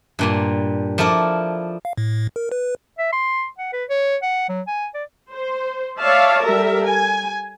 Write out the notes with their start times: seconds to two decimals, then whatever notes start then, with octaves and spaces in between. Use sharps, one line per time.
0.19 G2 A#2 G3
0.98 F3 E4 A4 A#4 D5
1.85 F5
1.97 A2
2.36 A#4
2.52 B4
2.98 E5
3.12 C6
3.59 F#5
3.73 B4
3.89 C#5
4.22 F#5
4.49 F#3
4.67 G#5
4.94 D5
5.33 C5
6.00 C#5 D5 E5 F5 A5
6.45 G3 A4 A#4 E5
6.87 G#5